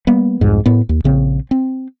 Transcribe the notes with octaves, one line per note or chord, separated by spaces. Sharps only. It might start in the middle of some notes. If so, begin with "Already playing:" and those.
G3 A#3 B3
C2 F2 G#2
A2 B3
D#2
A#1 C#3 C4
C4